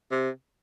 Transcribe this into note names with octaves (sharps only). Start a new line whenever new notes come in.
C3